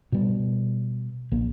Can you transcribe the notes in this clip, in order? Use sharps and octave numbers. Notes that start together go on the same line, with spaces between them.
B2 G3
A#1 A#3